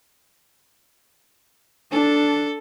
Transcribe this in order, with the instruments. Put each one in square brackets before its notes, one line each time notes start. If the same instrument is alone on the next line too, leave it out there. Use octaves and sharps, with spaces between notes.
[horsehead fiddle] D4 [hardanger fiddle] A4